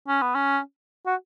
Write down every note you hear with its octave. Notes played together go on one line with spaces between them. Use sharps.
C#4
B3
C#4
F#4